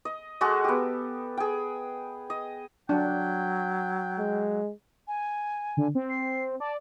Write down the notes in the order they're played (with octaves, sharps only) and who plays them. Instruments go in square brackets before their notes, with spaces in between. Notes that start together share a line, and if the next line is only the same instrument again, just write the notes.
[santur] D#5
G#3 F#4 G#4 A4
B3 G4
G#4 G5
D#5
[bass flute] F#3 [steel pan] D4 [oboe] G5
[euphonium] G#3
[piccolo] G#5
[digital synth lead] D3
C4
[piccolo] C7
[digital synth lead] D5 [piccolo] A5